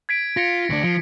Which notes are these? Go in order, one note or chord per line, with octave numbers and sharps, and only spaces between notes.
G#6 B6 D7
F4 A#6 C#7
D2 D4
F3